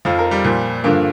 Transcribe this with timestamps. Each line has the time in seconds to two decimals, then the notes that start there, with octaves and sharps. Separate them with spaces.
0.05 F2 F3 F4
0.19 A#4
0.31 G3
0.44 A#2 F3
0.84 G2 D3 F3 A#3